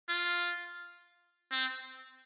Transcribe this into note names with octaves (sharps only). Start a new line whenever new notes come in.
F4
C4